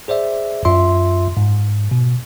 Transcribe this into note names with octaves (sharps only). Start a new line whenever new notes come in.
G#4 C5 D5 E5
F#2 F4 E5 C6
G#2
B2